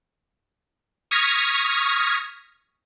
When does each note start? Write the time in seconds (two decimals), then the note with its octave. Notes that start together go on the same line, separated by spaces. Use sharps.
1.11 C#6 D#6 F6 G#6 A#6 B6